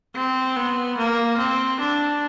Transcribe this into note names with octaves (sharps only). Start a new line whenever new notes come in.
C4
B3
A#3
C4
D4